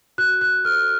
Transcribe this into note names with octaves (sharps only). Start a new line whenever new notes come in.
F#4 F#6
F#6
A4 C5 F6